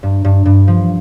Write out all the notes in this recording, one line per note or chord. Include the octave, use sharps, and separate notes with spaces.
G2
G2
G2
F3